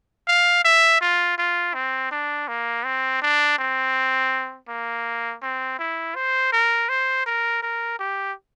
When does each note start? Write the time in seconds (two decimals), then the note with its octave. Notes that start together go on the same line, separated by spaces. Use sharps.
0.28 F5
0.64 E5
1.01 F4
1.38 F4
1.74 C4
2.11 D4
2.48 A#3
2.85 C4
3.22 D4
3.58 C4
4.68 A#3
5.42 C4
5.79 E4
6.15 C5
6.52 A#4
6.89 C5
7.26 A#4
7.62 A#4
7.99 G4